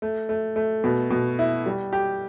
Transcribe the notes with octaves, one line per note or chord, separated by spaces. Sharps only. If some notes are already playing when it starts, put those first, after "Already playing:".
A3
A3
A3
B2
B2
E4
G3
G4